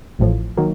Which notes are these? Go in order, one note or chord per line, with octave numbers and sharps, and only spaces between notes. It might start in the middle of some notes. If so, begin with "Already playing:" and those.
A1 A2 F3
D#3 F#3 A#3